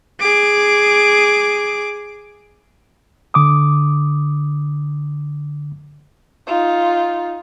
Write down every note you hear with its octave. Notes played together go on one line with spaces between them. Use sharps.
G#4 D6
D3 D6 D#6
D#4 F4